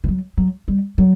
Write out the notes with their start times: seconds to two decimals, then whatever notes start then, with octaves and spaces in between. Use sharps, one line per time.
0.04 E3
0.08 F#3
0.37 F#3
0.68 G3
0.98 F#3